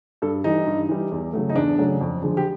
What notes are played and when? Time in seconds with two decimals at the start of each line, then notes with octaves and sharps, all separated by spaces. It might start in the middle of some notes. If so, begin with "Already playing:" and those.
0.22 G2 A4
0.44 E3 G3 D#4
0.66 G2
0.89 E3 G3
1.11 E2
1.33 C#3 F#3 A3
1.49 D#4
1.56 E2 D4
1.78 C#3 F#3 A3
2.01 F2
2.22 D3 F3 G#3
2.37 G4